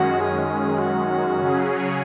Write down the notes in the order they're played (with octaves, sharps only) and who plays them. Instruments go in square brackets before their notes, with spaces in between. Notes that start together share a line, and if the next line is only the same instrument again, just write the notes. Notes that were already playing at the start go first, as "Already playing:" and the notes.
Already playing: [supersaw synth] F#2 D#3 G#3 C#4 [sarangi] F#4
[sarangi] G#4
F#4
[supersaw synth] C#3 F#3 C#4 G#4